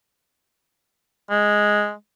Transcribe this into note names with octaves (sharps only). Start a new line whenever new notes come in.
G#3